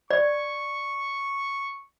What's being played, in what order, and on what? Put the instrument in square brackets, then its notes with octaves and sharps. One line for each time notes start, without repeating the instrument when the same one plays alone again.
[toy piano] D5 [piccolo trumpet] C#6